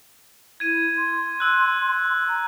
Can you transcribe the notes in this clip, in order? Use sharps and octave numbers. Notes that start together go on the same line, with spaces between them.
E4 G#6 D#7
C6
E6 F#6
A#5